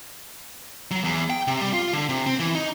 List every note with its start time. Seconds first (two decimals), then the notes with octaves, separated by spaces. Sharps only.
0.91 F#3
1.04 E2
1.30 G5
1.47 C3
1.61 G3
1.73 F4
1.93 D3
2.09 C3
2.26 C4
2.39 E3
2.55 D#4